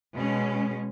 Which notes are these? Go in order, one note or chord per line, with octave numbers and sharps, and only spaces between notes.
B2 G#3 C#4